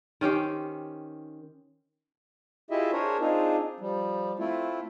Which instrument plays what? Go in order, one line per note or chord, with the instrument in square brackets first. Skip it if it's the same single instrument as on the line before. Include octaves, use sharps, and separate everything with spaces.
[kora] D#3 C#4 G4 C5
[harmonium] E4 F4 G4 G#4 D#5 E5
D4 G#4 A#4 C5 C#5
C4 D4 D#4 F4 G#4
F3 G3
A3 C4 E4 F4